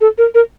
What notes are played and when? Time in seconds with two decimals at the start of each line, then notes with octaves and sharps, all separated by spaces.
0.01 A4
0.18 A#4
0.35 A#4